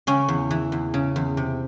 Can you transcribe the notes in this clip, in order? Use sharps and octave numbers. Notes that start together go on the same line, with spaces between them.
C#3 C#4
E2
E3
E2
C#3
E2
C3